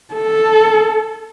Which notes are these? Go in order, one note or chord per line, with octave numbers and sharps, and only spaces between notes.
A4